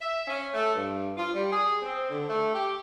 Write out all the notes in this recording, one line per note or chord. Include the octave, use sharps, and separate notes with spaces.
E5
C#4
A3
G2
F4
G3
G#4
C4
D3
A3
G4